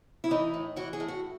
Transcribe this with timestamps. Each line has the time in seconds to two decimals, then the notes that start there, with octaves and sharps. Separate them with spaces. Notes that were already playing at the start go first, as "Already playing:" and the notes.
0.24 E4
0.31 E3 D#4
0.54 A2
0.76 E3 F#4
0.93 G#4
1.00 A2
1.08 F#4